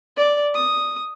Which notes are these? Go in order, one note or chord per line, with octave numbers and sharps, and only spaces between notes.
D5
D#6